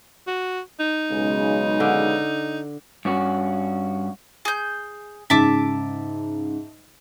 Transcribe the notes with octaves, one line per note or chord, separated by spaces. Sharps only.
F#4
D#4
B1 C#3 G#3
D3
G2 C#4 F#4
G#4 G6
G#2 C#3 E5 A5 D6